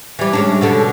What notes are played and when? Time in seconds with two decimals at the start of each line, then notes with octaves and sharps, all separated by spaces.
0.19 E3 G3
0.33 G#3 C#4 D4
0.61 B2 D3 A4